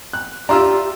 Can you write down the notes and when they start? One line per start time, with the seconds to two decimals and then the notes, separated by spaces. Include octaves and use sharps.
0.13 F#6
0.49 D4 E4 F4 G4 A#5 C6 E6